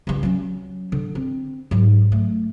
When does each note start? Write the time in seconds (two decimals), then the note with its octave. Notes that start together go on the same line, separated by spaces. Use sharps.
0.07 C#2 G3
0.23 F#3 C#4
0.92 D3
1.15 C4
1.71 G#2 F#3
2.12 A3